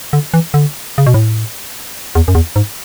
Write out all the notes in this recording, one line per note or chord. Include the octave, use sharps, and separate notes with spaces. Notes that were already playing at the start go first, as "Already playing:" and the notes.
D3
E3
D3
C#3
B2
A2
E2
F#2
E2
G#2